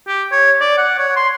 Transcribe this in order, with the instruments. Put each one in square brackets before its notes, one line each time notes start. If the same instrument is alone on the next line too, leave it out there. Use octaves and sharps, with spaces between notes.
[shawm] G4
C#5
D5
F#5
C#5
C6